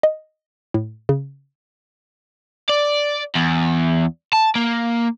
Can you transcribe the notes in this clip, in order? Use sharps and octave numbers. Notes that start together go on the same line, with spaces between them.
D#5
A2
C#3
D5
E2
A5
A#3